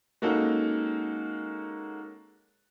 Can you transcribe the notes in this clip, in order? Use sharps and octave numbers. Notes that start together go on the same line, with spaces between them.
G#3 A#3 C#4 D#4 F#4 A4